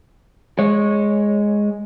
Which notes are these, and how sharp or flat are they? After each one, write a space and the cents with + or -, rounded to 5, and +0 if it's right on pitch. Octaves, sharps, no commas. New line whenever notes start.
G#3 +0 C#5 -10